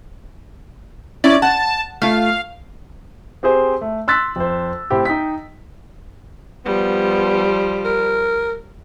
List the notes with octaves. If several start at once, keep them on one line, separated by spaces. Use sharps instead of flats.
C#4 E4 D5
F#5 A5
A3 F4 F5
C4 G4 G#4 C5
A3
C6 E6 F#6 A6 B6
F2 C5
A2 C4 E4 G4
D#4 G5 B6
F3 G3 B3
A#4